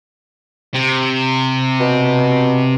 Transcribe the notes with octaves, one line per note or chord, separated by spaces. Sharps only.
C3
B2